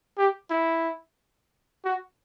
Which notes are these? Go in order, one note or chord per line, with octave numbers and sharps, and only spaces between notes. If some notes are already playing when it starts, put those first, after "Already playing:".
G4
E4
F#4